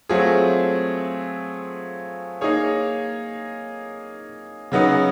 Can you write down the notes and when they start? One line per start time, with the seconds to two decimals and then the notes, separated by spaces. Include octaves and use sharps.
0.09 F#3 A3 C4 F4 G#4
2.41 A#3 D#4 G#4 C#5
4.72 C#3 F#3 B3 D#4